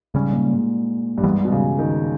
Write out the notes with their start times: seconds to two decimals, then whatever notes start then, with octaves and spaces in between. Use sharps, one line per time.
0.14 G#2 C#3 G3 C#4
0.28 G#2
0.32 A#2
0.51 G#2
1.18 G2
1.23 G#2 E3 G3 B3
1.45 B2
1.52 C#3
1.79 D#3